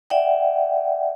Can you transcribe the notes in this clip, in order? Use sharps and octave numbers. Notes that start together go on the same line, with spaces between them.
D5 E5 F#5 G5